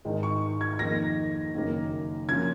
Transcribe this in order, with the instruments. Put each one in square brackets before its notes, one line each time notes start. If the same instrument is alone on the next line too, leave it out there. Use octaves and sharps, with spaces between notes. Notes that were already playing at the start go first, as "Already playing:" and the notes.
[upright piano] G#1 G#2 D#3 G#3
C#6
G#6
F2 D#3 A#3 D#4 A#6
F#1 F#2 D#3 A#3
F#2 F3 A#3 C#4 G#6